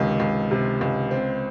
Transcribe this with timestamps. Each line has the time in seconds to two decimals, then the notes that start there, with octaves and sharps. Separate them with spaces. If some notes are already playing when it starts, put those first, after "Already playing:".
Already playing: C#2 C3 D#3
0.20 C#2
0.51 C3
0.81 C#2
1.11 C4